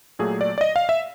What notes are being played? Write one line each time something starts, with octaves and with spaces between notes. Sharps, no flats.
A#2 F#3 A3 G#4
D5
D5
D#5
F5
E5